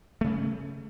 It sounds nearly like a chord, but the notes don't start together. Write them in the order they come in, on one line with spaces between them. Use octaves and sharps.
A3 C#3 C#4